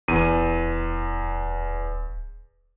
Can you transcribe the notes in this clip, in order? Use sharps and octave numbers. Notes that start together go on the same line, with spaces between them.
D1 E2 D#7